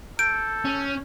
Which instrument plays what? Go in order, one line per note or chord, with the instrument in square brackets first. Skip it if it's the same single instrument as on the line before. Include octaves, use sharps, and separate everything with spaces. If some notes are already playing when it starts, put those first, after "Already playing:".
[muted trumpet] A4 [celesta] G6 [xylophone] D7
[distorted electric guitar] C#4